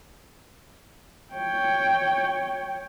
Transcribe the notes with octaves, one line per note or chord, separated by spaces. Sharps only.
C#5 G5